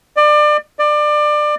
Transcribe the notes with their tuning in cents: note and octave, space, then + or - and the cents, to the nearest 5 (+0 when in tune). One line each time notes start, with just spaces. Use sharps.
D5 +30
D5 +25